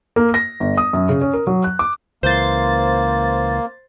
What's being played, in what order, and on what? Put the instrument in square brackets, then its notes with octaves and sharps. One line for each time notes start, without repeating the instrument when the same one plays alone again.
[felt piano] A#3
A#6
G1
D#6
F#2
C#3
C#4
A#4
F#3
F#6
D6
[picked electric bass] C#2 E3 [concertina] A#3 [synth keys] C5 A6